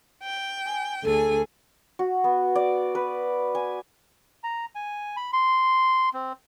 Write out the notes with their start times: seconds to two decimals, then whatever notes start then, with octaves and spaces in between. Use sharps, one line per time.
0.22 G5
0.65 G#5
1.03 D2 G#4 A4 G#5
1.99 F#4
2.24 B3
2.55 D5
2.95 B4
3.55 G#5
4.44 A#5
4.75 G#5
5.17 B5
5.33 C6
6.14 C4